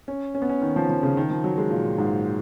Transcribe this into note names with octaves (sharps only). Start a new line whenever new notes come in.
C#4
C#4
B3
C#4
D#3
F3
F3
C#3
D#3
F3
F#3
G#3
A#2
G#2